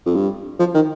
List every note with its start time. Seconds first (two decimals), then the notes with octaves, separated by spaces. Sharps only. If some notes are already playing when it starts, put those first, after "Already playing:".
0.06 F2
0.15 G2
0.59 F3
0.75 D#3